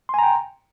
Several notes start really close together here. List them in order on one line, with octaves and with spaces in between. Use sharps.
C6 G#5 A#5 G5